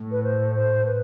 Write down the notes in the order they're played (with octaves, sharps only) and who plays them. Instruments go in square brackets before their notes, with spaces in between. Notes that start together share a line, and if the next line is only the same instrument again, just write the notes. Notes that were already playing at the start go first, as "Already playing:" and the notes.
Already playing: [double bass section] A2
[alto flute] B4
C5
C5
B4